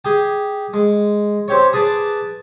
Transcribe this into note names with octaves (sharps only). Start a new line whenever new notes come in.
G4 G#4
G#3
C4 G4 C#5
G#4 B4 A5 D6